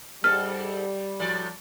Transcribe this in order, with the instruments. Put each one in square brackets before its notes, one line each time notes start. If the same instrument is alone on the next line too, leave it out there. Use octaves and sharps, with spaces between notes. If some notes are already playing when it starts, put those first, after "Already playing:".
[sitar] G#2 A4 [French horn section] G3 [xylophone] F6
[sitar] A2 F3 D5